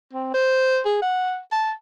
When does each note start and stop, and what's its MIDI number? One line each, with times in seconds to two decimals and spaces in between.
0.13 0.31 60
0.34 0.80 72
0.85 0.97 68
1.02 1.39 78
1.52 1.72 81